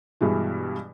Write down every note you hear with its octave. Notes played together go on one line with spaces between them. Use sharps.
G2 B2 E3 G#3